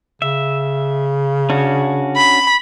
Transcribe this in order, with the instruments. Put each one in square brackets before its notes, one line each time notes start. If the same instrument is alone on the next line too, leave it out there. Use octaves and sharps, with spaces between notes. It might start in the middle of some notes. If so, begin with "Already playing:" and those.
[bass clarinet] C#3 [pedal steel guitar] E5
[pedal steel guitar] C#4 D4 F#4
[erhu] B5